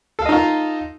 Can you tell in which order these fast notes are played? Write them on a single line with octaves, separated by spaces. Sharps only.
A4 F5 D#5 D#4 F4